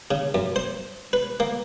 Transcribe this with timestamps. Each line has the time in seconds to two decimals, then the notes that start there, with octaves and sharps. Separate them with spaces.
0.11 C#3
0.34 F#2
0.56 C5
1.13 B4
1.40 A#3